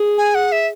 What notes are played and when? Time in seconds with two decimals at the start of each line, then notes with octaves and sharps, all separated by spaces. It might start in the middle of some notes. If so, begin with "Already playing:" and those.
Already playing: G#4
0.18 G#5
0.35 F#5
0.52 E5